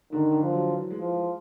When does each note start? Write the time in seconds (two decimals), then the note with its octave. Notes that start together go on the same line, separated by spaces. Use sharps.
0.12 D3 D#3
0.32 D3
0.42 F3
0.51 F#3
0.71 E3
0.91 G#3
1.00 F3
1.10 G#3